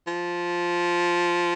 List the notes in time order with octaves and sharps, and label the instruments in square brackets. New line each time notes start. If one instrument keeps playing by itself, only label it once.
[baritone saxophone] F3